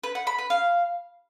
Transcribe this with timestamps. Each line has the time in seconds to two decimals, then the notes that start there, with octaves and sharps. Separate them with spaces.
0.03 B4
0.15 F#5
0.27 B5
0.38 B4
0.50 F5